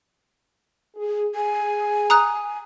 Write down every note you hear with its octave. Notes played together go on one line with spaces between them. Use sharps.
G#4
G#4 G#5
A#5 D#6 F#6